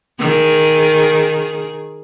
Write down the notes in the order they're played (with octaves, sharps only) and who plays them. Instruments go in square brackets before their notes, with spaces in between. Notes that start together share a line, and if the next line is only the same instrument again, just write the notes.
[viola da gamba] D#3 G#4